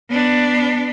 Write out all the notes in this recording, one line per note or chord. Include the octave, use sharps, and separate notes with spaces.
B3 D4